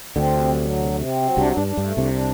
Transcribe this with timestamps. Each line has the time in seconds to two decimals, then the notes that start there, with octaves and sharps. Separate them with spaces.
0.16 D2 D3 C4
0.31 C3
0.47 F#3
0.61 F#3
0.77 C3
0.92 C3
1.07 C4
1.22 F#3
1.37 C2 C3 D4
1.52 G2 D4
1.67 D4
1.77 G2 A3
1.97 C2 C3 D4
2.13 D4